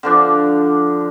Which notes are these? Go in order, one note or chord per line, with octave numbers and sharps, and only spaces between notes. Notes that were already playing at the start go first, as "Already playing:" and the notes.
D3 F3 D4